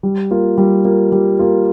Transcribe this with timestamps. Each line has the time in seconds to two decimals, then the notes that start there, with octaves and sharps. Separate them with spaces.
0.03 G3
0.31 A#3 F4
0.58 G3
0.85 A#3 F4
1.12 G3
1.39 A#3 F4